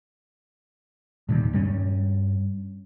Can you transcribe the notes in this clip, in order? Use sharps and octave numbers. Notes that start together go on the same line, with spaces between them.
D#1 A#2 D#3 G3
G2 G3 C#4